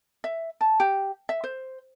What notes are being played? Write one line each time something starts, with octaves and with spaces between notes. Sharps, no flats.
E5
A5
G4
E5
C5